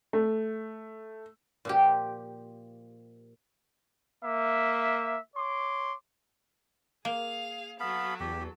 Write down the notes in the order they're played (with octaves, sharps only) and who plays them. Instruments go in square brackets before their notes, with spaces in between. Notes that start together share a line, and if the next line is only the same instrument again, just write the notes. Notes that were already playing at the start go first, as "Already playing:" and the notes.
[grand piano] A3
[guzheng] A#2 F3 G4
[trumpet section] A#3 E5
C#5 C6 D6
[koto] A#3 [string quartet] G#4 F5
[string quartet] F#3 A4 [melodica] B3 F5 B5
[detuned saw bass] E2 [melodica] G4